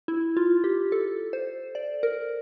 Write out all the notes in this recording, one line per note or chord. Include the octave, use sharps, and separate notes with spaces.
E4
F4
G4
A4
C5
D5
A#4